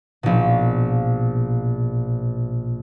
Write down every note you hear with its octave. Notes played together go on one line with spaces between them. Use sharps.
A#1 B2